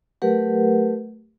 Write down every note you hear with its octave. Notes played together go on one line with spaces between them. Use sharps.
F#3 A3 G4 A#4 B4 F#5